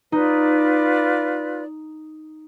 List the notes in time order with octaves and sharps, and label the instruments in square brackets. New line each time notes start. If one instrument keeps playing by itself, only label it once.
[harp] D#4 [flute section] F4 B4 D5